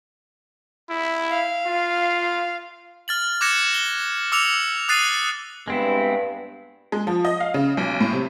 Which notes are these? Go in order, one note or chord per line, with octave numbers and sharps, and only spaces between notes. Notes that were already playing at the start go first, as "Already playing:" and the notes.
E4
F5
F4
F6 A6 F#7
D6 F#6 G#6 A#6 C#7 E7
G7
D6 E6 C#7 F7
D#6 F#6 A6 C7 D#7
G2 G#3 B3 C4 E4
G#3
F3
D#5
F5
C#3
B1
A2
C3